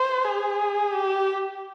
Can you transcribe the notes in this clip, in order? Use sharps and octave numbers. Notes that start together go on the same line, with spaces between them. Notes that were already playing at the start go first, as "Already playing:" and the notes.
Already playing: C5
G#4
G4